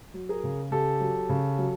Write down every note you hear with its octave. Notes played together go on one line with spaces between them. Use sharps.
F#3
G#4 A#4
C#3
C#3 G4 A4
F#3
C#3
F#3